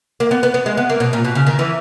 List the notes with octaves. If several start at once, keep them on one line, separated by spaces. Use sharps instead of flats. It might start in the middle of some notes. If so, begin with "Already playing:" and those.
A#3
B3
B3
B3
G#3
B3
A#3
B2
A#2
B2
C#3
D#3
E3